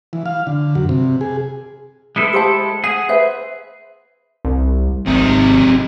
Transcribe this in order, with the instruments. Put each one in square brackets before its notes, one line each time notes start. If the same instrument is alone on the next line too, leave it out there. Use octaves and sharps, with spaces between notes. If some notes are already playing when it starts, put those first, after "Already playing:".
[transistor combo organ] E3
F5
D3
F#2
C3
G#4
[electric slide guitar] G#3 E4 A4 [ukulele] B4
[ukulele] G4 C5 A5
[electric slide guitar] G#4 [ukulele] F#5
[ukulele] B4 C5 E5
[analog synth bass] C2
[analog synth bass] G#1 [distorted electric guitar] C3 D#4